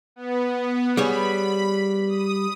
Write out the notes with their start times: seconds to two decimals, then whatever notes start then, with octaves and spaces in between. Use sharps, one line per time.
0.16 B3
0.97 G3 G#4 C#5 B5
2.07 D#6